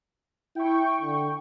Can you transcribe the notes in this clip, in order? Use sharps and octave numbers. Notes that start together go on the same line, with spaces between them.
E4 G5 C#6
D3